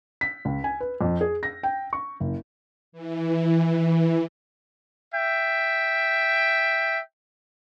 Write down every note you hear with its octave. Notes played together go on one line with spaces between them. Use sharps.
B6
C#2
G#5
B4
F2
G#4
A#6
G5
C#6
F#1
E3
E5 G5